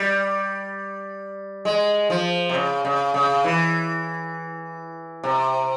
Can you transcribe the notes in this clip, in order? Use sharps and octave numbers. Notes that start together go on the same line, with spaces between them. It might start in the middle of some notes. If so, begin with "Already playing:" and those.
Already playing: G3
G#3
F3
C3
C#3
C#3
C#3
E3
C3